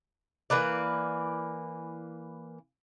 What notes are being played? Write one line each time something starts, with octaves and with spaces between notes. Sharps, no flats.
E3 A#3 B4 D5